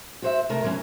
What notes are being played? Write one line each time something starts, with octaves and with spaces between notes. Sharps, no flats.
F#4 C5 E5
C3 A3 A#4
D3 F#3 A#3 C#4 E4